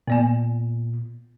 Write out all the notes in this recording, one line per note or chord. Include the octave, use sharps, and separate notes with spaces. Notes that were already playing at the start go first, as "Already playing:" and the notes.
A#2 B3 D5 G#5